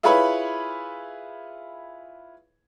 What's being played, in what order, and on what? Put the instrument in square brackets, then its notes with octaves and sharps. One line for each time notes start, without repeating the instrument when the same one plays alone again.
[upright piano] E4 F4 G#4 B4 C#5 B5